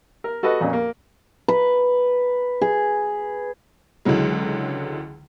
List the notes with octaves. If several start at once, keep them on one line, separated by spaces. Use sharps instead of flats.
A#4
F#4 A4 B4 D#5
F2 A#2 C#4
A#3
B4
G#4
C#2 D3 E3 F#3 G#3